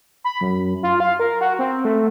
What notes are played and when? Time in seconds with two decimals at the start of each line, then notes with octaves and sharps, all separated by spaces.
0.24 B5
0.41 F#2
0.83 F4
1.00 F5
1.19 A#4
1.41 F#4
1.59 C4
1.85 A3